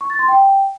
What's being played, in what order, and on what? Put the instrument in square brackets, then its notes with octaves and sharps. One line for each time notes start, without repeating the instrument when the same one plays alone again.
[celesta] C#6
A6
C6
G5